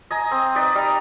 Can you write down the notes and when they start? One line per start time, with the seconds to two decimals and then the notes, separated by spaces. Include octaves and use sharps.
0.11 D#5 G#5 A#5
0.31 C4
0.55 D#4 B4 D5 D#5
0.75 G3 A#5